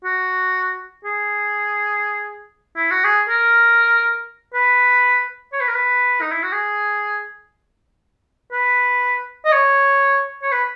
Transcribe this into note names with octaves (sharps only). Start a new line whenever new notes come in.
F#4
G#4
E4
F#4
G#4
A#4
B4
C#5
B4
A#4
B4
D#4
E4
F#4
G#4
B4
D#5
C#5
C#5
B4